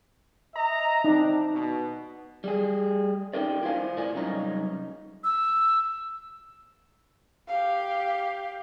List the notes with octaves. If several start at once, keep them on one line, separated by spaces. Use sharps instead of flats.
D#5 E5 A#5
C4 D4 D#4
B2
G3 G#4
C#4 D#4 G4 A#4 D5
E4 F4 C5 F5 G#5
G#2 A#4 D5 G#5
C2 F#2 C#4 D#4 A#5
E6
G4 F5